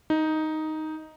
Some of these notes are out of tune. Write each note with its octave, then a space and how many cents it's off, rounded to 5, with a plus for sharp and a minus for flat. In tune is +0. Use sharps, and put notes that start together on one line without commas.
D#4 +5